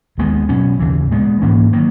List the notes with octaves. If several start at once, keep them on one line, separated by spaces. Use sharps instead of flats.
D#2 D#3 G#3 B3
B2 F#3 C#4
D#2 C#3 E3
A#2 G#3 B3
G#2 E3 A#3 C#4
D#3 F#3 A#3